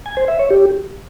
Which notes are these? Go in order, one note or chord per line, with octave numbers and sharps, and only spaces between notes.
G#5
C5
E5
C#5
G4